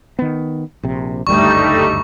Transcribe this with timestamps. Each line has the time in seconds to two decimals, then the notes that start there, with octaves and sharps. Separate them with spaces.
0.19 D#3 B3
0.83 A#1 C3
1.27 F#1 D2 G2 G3 A3 D#4 C#6